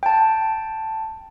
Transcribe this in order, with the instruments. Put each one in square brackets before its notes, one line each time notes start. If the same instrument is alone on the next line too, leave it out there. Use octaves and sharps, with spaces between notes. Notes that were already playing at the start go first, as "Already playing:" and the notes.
[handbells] G5 A5